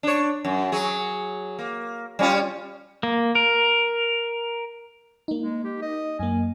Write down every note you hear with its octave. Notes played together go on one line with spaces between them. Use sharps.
D4 C#5
F#2
F#3 G#4
A#3
G3 C#4 F4
A#3
A#4
A#3 D#4
G#3
G4
D#5
F#2 A#3 G#5